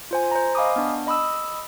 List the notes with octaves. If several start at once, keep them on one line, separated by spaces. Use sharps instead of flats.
F4 C5 G#5
C5 A#5
D#5 F5 G#5 B5 D6 D#6
B3 D4
D#5 B5 D#6 E6